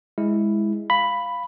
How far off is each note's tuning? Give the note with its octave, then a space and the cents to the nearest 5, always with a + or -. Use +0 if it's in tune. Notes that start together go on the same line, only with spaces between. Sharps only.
G#3 -5 E4 -5
F5 +0 B5 +5